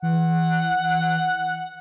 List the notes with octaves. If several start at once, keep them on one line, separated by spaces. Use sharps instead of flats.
E3 F#5